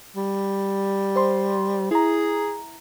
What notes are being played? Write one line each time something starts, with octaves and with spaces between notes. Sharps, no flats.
G3
C5 C6
E4 G#4 A#5